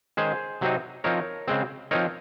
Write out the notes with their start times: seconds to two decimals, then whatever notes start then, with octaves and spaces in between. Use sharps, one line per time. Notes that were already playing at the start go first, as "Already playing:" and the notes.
0.17 D#3 G#3 C#4 G#4 C5
0.61 C3 F#3 C4 D#4
1.04 F3 C4 D#4 A#4 C#5
1.48 C#3 G#3 C4
1.91 F3 C4 D#4 A#4 C#5